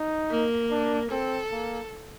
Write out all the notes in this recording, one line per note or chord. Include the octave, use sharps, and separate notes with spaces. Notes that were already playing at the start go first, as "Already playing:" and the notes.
Already playing: D#4
A#3
D4
C4 A4
A#3